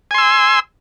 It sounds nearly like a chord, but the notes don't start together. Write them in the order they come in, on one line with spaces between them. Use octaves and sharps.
G#5 C6 E6